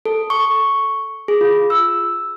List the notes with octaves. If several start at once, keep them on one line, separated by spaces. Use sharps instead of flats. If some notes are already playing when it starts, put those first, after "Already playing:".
A4
C#6
G#4
F4
E6